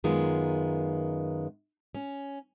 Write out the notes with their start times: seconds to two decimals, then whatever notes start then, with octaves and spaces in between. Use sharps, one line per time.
0.04 F#2 D#3 G#3 B3 F4
1.95 C#4